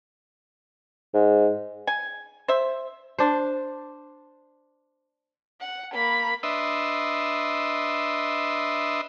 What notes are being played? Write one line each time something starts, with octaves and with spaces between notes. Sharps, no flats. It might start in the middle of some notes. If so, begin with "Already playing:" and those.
G#2
G#5
C5 E5
D4 C5
F#5
A#3 B5
D4 B4 D#5 E5 C6